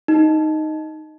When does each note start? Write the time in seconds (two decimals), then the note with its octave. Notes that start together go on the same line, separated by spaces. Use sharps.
0.08 D#4